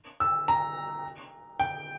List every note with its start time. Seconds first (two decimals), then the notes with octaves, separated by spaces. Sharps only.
0.20 E6
0.48 A#5
1.60 G5